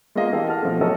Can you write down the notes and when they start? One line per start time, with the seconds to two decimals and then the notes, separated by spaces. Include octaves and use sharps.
0.15 G#3 A#3 B3 F4 D#5 F5
0.32 E3 G4 A4 D#5 F5
0.47 F#5 A5 F6
0.63 B2 F3 A3
0.81 F#3 A3 A4 A#4 C#5 D#5